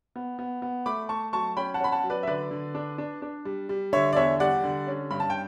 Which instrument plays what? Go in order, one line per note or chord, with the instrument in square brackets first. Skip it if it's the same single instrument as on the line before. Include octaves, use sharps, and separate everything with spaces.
[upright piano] B3
B3
B3
A3 B5 D6
A3 A5 C#6
F#3 A5 C#6
C#4 G5 B5
F#5 A5
C#4 B5
F#5 A5
F#3
B4 D5
E5
D3 B4 D5
D3
D4
D4
D4
G3
G3
D3 C#5 E5
D5
E2 C#5 E5
G3 D5 F#5
D3
C#4
G2 B5
A5
G5